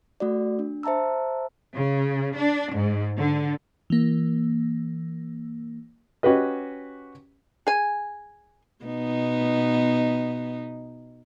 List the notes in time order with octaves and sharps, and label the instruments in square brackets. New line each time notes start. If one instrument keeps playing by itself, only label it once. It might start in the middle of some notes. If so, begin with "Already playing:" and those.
[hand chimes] A3 F#4 D5
D4
C5 E5 A5 A#5 E6
[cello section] C#3
D4
G#2
D3
[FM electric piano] E3 A#3
[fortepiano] C#4 F#4 G4 B4 D#5
[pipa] G#4 G#5
[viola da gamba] B2 B3 D#4